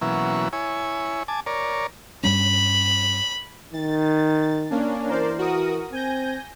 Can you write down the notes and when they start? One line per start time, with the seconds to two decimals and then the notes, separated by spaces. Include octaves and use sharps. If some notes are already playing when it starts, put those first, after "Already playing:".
0.01 B2 E3 F#3 A#3 C#4 E4
0.53 E4 C#5 G#5
1.28 G#5 A5 D6
1.46 A#4 C#5 D5
2.23 G2 G3 C#4 B5
3.73 D#3 A6
4.70 A#3 C#4 D4
5.09 E3 A#4 C5 D5
5.38 F#4 A#4 D#6
5.92 C4 G#5 G6 A#6